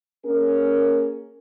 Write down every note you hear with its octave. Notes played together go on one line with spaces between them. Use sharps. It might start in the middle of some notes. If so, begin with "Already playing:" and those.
A#3 C#4 G#4 A#4